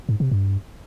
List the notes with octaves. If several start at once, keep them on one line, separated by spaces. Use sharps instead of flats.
G#2
C3
G2